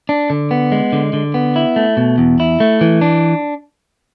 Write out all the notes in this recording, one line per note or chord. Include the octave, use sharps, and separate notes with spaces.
D4
D3
B3
G#3
D3
D3
B3
E4
A3
B2
E2
E4
A3
E3
D4